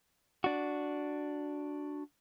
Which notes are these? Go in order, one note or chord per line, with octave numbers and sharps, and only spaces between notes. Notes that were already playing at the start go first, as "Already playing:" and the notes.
D4 F#4